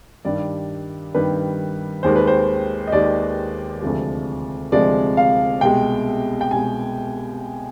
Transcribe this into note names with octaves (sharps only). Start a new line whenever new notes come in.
G2 D#3 G3 D5
G2 D#3 G3 B4
D#2 D#3 G#3 C5
B4
C5
D#5
D#2 D#3 G#3 D5
D2 C3 F3 G#3
D2 C3 F3 G#3 D5
F5
C2 B2 G#3 G5
G5
C2 B2 G#3 G#5